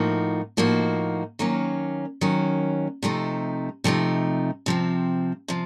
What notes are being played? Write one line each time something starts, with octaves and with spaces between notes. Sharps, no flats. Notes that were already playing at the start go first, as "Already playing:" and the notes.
Already playing: A2 F3 A#3 D#4 F#4
A2 F3 A#3 D#4 F#4
D#3 F#3 A#3 C#4
D#3 F#3 A#3 C#4
C3 F3 A3 D#4
C3 F3 A3 D#4
C3 F3 C4
C3 F3